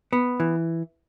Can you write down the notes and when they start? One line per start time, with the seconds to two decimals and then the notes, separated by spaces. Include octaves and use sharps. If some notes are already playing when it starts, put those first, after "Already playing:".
0.13 B3
0.40 E3